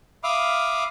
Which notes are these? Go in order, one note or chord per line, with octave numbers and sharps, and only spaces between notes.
E5 F5 B5 D6 D#6 F6